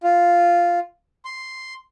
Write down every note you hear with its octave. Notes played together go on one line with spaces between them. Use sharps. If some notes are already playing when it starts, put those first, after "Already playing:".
F4
C6